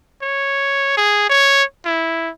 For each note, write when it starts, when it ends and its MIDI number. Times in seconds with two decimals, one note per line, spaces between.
0.22 0.94 73
0.97 1.24 68
1.29 1.63 73
1.85 2.30 64